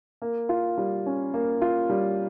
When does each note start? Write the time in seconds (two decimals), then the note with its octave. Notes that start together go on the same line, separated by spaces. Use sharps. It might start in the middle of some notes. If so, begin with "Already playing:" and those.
0.22 A#3
0.49 F4
0.78 G3
1.06 C#4
1.34 A#3
1.62 F4
1.89 G3